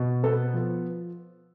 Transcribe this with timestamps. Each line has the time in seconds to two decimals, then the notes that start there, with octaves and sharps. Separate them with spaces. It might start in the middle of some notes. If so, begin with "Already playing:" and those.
Already playing: B2
0.24 B3 A4
0.54 F3